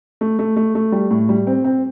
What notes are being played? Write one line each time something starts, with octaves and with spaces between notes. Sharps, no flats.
A3
A3
A3
A3
G3
A2
G3
C4
C4